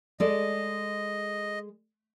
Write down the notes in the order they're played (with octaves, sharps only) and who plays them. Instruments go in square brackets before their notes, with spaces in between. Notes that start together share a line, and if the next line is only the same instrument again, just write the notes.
[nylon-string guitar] G#3 A4 D5 [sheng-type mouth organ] D#5